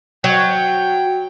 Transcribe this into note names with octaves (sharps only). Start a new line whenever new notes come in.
F#3 G5